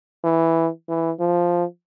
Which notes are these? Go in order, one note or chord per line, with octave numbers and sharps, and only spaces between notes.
E3
E3
F3